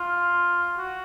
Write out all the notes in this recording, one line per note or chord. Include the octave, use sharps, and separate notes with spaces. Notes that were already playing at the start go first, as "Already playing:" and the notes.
Already playing: F4
F#4